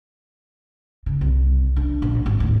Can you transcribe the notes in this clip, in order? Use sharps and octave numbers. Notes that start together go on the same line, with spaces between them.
C#3
C2
D4
A#1
G#1 D#2
D#2 A2